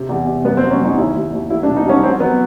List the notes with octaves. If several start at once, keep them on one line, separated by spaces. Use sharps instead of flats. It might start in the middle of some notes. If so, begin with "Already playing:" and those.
Already playing: C3
E2
C3
F#2 B3
C4
F#3
C#4
F#2 D#4
D#2 E4
D#2
D#2
F#3 E4
D4
B2
D#4
C2 C#4
F#3 C4
F#3 B3